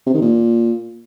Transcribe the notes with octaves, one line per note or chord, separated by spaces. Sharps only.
C3
D#3
A#2